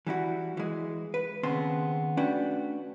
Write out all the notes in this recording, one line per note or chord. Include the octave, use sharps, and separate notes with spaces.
E3 G3 E4 F#4
E3 G#3
B4
D#2 C#3 B3 C4 C6
A3 C#4 D4 F#4 B4 G5